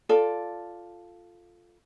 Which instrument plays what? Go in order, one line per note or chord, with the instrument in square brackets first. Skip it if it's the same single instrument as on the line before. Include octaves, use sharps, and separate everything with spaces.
[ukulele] F4 A4 D5